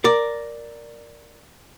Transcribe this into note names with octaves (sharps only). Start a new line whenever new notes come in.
A#4 D5